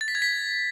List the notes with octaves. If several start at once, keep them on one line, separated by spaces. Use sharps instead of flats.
A6
B6
G#6
B6